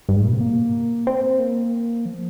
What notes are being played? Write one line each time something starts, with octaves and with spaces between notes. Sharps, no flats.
G2
G#2
A#2
C3
A#3
C4
A#3
F3